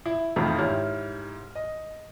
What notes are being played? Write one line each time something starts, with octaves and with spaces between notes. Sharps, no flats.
E4
E1 F2 A2 D#3 F4 B5
G#2 E4 G4 C#5 F6
D#5